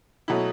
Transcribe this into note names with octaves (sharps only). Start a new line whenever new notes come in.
B2 F#3 A3 E4